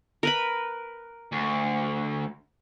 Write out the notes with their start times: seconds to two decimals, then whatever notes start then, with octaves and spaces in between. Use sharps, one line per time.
0.23 A#4 B4 B5
1.32 D2